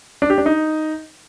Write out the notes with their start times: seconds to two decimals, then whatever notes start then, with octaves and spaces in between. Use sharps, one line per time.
0.22 D4
0.30 G4
0.38 D4
0.46 D#4